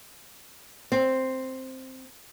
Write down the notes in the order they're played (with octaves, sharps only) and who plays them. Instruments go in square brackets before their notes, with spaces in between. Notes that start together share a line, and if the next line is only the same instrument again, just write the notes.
[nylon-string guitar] C4